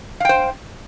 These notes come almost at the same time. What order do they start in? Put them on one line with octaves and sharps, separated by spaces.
F5 G5 C5